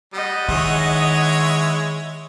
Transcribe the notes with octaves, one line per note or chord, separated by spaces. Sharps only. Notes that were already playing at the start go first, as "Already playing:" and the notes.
G3 D#5 F#5
D#3 G#3 E4 C#5